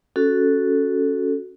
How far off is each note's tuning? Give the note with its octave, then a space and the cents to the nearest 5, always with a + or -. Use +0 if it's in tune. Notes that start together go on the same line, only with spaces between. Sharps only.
C#4 +0 F#4 +0 A4 +0